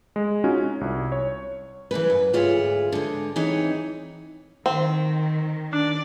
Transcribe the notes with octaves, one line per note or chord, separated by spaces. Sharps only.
G#3
C#4 D#4 F4 F#4
C#4
C2
C#5
E3 F3 G#3 B4
F#2
D2 G#2 F4 G#4 C#5 E5
D3 G#3
E3 C4 D#4 G#4 C#5
D#3 C4
D4 D5